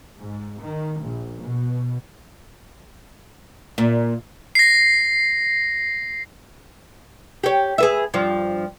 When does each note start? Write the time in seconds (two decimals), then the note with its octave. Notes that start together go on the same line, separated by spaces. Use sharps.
0.18 G#2
0.62 D#3
1.01 A#1
1.42 B2
3.78 A#2
4.55 A#6 C7
7.44 G4 C#5
7.78 G#4 B4 E5
8.14 G2 F3